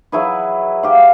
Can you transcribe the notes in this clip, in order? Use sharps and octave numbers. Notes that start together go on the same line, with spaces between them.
F#3 E4 G#4 B4
G4 F5